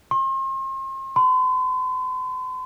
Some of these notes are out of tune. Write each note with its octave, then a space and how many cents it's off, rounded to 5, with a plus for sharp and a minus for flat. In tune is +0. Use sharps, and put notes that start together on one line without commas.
C6 +40
C6 -45